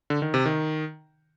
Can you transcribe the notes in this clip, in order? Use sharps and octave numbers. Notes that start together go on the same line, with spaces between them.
D3
D#3
C3
D#3